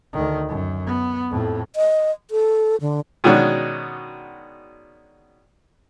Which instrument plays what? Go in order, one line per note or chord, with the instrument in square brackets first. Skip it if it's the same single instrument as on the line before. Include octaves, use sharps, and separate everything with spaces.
[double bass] D2 D#3
F#2
B3
F2 A2
[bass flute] D#5
A4
D3
[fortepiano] B2 D#3 G#3 C#4 D4 F#4